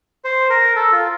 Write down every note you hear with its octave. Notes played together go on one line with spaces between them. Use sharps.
C5
A#4
A4
F4